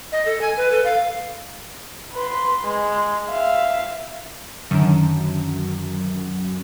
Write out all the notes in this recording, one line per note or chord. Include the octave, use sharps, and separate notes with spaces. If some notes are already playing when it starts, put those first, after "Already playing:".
D#5
A4
G#5
B4
A4
F5
B4 C6
G#3
E5 F5
F#2 D3 D#3